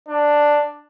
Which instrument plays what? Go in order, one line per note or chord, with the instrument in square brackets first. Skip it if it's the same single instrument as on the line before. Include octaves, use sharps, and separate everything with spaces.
[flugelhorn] D4